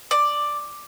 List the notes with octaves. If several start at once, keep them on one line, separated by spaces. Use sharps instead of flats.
D5